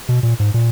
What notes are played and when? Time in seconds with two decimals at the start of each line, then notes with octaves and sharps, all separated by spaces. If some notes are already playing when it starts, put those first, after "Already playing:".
0.09 B2
0.23 A#2
0.40 G#2
0.54 A#2